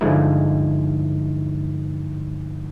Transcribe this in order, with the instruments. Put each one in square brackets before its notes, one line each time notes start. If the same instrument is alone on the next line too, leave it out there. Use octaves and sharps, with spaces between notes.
[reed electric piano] G2 D3 F3 G#3 D#4 E4